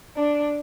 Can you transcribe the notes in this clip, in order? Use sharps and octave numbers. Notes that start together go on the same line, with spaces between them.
D4